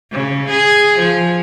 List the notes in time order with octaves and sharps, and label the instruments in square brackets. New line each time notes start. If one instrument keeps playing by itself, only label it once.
[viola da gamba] C#3
G#4
F3